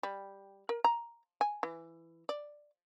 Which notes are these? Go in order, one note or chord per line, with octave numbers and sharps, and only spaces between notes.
G3
A#4
A#5
G#5
E3
D5